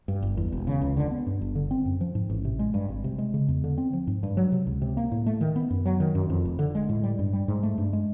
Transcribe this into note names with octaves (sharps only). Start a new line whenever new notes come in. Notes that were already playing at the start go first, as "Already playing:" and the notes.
G2
G1
E2
E1
C#3
C#2
D3
B3
G2
G1
D3
C4
F#2
F3
G#2
A1
C3
G#3
G2
G#1
C3
G#3
C#3
E2
D3
C4
F3
G#2
G2
F#3
C3
C#2
C3
A#3
A2
A3
D#3
B3
F#2
F#3
D#3
F#2
F2
F1
D3
G#3
A2
G3
G2
G3
G#2
A3
G2
G#3